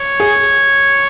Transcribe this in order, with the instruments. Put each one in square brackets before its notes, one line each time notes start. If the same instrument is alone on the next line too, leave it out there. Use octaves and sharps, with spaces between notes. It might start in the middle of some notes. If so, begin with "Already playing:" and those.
Already playing: [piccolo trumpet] C#5
[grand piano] G#4